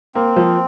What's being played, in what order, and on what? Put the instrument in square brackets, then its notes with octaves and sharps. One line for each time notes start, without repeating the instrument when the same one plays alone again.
[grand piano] A#3 [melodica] C4
[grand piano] F3